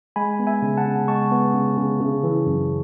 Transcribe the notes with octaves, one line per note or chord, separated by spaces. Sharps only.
G#3 G#5 B5
B3
E5 G#5
C#3
F#5 A5
C#3
G#3 A5 C#6
B3
C#3
C#3
C#3
E3
F#2